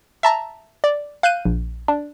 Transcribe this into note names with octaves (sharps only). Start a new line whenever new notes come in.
E5 A5 A#5
D5
F5 F#6 G6 D#7
A#1
D4